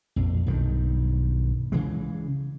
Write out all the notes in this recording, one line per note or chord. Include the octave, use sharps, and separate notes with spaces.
A#1 F2
B1 G2 D#3
C#3 E3 G#3